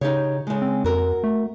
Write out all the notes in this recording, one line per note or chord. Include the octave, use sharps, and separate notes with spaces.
C#3 D#4 G4 C#5
C#3 G#3
C4
F2 F#4 A#4
A3